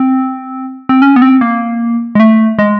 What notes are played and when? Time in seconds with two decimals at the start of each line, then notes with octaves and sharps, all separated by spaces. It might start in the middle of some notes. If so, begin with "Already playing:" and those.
Already playing: C4
0.89 C4
1.02 C#4
1.16 B3
1.22 C4
1.41 A#3
2.15 G#3
2.20 A3
2.59 G#3